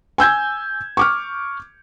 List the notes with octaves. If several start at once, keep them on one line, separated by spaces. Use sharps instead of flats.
G#5 E6 G6 G#6
C#6 D6 F6